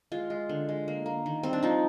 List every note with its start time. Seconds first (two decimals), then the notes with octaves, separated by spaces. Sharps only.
0.12 G#3 F4
0.30 G#3
0.49 D3
0.69 G#3
0.88 A#3
1.06 A#3
1.26 D#3
1.43 G3 C4
1.53 D4
1.63 F3 D#4